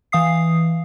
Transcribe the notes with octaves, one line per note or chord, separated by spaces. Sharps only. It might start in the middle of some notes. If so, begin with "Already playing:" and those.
E3 F5 D#6 C7